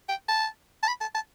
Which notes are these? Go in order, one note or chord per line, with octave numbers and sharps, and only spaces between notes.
G5
A5
A5
B5
A5
A5